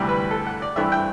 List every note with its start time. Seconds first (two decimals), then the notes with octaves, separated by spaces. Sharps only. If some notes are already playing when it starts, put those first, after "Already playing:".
Already playing: D2 C3 E3 G3
0.09 B4
0.31 A4
0.46 F#5
0.62 D5
0.76 G2 E3 A3 C4 E5
0.92 G5